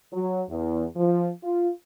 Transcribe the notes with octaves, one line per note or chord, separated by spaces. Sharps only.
F#3
E2
F3
F4